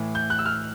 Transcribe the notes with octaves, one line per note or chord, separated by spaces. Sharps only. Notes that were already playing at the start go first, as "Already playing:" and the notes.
Already playing: A2 E3
G6
F#6
E6
F6